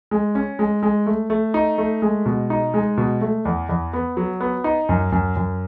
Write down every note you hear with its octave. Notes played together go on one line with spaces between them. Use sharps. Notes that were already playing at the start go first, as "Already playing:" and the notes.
G#3
C#4
G#3
G#3
A3
A3
D#4
A3
G#3
B2
D#4
G#3
B2
A3
E2
E2
B3
F#3
B3
D#4
F#2
F#2
F#2